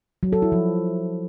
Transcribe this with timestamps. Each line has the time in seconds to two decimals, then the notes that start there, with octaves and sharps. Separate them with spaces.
0.23 F#3
0.33 A4
0.42 E4
0.52 F3